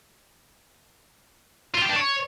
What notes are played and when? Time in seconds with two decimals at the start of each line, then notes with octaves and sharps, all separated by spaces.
1.75 F4
1.82 G4
1.89 D4
1.96 C#5